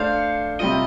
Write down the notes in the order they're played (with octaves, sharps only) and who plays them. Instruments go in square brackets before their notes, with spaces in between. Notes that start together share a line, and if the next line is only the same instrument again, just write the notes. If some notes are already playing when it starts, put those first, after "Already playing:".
Already playing: [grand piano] A3 D4 A4 C5 [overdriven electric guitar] F5
[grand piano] C3 G3 C4 F4 [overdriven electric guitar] D#5